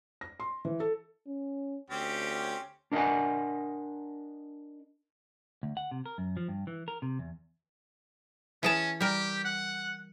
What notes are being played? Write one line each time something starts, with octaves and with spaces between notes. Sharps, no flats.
A#6
C6
E3
A4
C#4
D2 C4 C#4 G4
D4 A#4 D#5 F5 F#5 G#5
D2
F#5
C3
A#4
F#2
F3
G2
E3
A#4
C3
E2
E3 C#4 G#4 A5
G3 G4 A#4
F#5